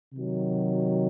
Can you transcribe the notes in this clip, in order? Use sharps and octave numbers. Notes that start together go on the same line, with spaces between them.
C3 D#3 F#3